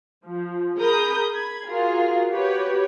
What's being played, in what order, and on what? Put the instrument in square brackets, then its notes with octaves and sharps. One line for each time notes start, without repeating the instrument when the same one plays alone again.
[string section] F3
G#4 A#4 B5 D#6 G6
B5 G#6
F4 F#4 G#4 A#4
F#4 G4 B4 C#5